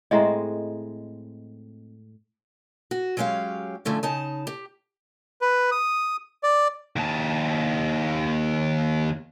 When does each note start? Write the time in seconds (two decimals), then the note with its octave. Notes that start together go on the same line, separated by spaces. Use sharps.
0.11 A2 G#3 C4 D#5 E5 A#5
2.91 F#4
3.17 F#3 G#3 C#4 G4 F5
3.85 D3 F3 A3 C#4
4.03 C#3 D#4 A5
4.47 G4
5.41 B4
5.71 D#6
6.43 D5
6.96 D#2 A5